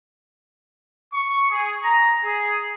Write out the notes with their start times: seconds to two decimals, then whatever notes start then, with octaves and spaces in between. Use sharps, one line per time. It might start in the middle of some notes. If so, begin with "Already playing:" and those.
1.14 C#6
1.50 G#4
1.83 A#5
2.24 G#4